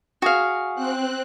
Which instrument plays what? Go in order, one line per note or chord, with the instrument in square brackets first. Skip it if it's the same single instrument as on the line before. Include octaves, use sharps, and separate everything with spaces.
[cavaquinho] F#4 G#4 F5
[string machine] C4 F#6